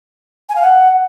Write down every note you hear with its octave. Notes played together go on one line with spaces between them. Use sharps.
G#5
F5
F#5